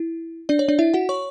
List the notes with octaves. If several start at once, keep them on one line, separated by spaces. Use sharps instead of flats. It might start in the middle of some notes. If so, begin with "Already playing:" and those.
Already playing: E4
D4 D5
C#5
D4 D5
E4 E5
F#4 F#5
C#5 C#6